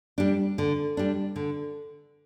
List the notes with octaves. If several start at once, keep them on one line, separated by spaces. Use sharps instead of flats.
G3 D4
D3
G3 D4
D3